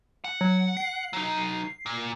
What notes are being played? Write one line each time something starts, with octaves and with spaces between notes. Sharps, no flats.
F#5
F#3
C7
F#3 D#4
A#2